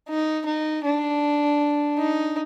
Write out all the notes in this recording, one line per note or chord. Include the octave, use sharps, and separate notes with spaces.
D#4
D#4
D4
D#4